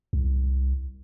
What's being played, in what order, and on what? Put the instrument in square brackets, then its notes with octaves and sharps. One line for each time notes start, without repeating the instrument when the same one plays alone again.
[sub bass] C2